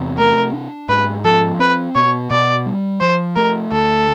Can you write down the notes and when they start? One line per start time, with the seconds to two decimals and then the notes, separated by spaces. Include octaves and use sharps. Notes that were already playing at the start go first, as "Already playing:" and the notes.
Already playing: E2 C3
0.19 A3 A#4
0.53 D4
0.89 G#2 B4
1.25 F3 A4
1.59 C4 B4
1.95 B2 C#5
2.31 B2 D5
2.66 G3
3.01 F3 C5
3.36 A3 A#4
3.72 D2 A4